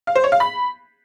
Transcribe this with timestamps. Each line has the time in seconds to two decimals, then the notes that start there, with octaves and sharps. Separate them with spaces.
0.07 F5
0.16 C5
0.24 C#5
0.32 F5
0.40 B5